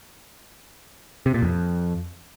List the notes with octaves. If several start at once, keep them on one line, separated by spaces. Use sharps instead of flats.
C3
A#2
F2